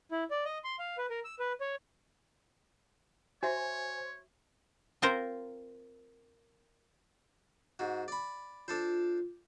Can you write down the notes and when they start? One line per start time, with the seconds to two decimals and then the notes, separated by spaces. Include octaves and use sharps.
0.12 E4
0.31 D5
0.45 D#5
0.64 C6
0.79 F5
0.98 B4
1.10 A#4
1.25 E6
1.39 B4
1.61 C#5
3.43 F#4 C5 C#5 E5 G#5
5.02 C4 F4 A#4 C5
7.79 G#2 F#4
8.08 D5 B5
8.68 D4 F4 A4 C5